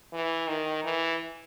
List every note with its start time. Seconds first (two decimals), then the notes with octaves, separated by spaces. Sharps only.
0.13 E3
0.48 D#3
0.84 E3